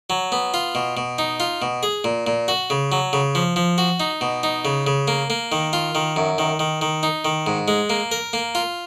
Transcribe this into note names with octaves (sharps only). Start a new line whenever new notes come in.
F#3
B3
F4
B2
B2
D#4
F4
B2
G#4
A#2
A#2
F#4
C#3
F#3
C#3
F3
F3
F#4
D#4
B2
D#4
C#3
C#3
A#3
A#3
D#3
F4
D#3
F#2
D#3
D#3
D#3
D#4
D#3
G#2
G#3
A#3
A#4
A#3
F4